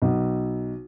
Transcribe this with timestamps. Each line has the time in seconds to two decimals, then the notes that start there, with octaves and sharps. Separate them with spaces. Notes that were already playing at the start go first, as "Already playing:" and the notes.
0.02 B1